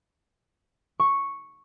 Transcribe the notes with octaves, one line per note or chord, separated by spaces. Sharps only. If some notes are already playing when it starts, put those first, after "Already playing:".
C#6